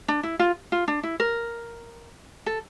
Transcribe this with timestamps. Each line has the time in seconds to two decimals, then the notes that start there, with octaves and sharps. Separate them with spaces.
0.08 D4
0.23 E4
0.39 F4
0.72 F4
0.88 D4
1.03 E4
1.20 A#4
2.46 A4